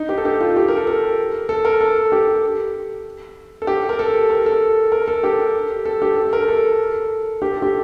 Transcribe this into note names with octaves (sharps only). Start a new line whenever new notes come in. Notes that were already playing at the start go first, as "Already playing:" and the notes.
Already playing: D#4
G4
A4
G4
F4
G4
A#4
A4
A#4
A4
A#4
A4
G4
A4
G4
A#4
A4
A#4
A4
A#4
A4
G4
A4
G4
A4
A#4
A4
G4
A4
G4